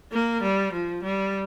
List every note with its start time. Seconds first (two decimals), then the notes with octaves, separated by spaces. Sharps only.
0.12 A#3
0.43 G3
0.73 F3
1.03 G3